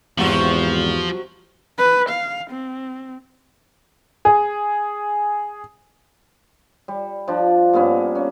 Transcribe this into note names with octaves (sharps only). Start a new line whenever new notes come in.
G#1 E2 C3 F3 F#3 F#4
B4
F5
C4
G#4
G3
F3 D4
G2 A#3 B3 C#4
C#4